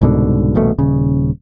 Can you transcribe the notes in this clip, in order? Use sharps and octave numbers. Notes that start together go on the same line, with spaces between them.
C2 G#2 B2 D3
D#1 A#1 B2 A3
D#1 C#3